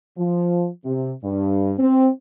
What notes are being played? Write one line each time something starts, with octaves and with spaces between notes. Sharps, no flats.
F3
C3
G2
C4